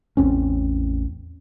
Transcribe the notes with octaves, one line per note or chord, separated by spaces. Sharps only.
A1 E2 C4 C#4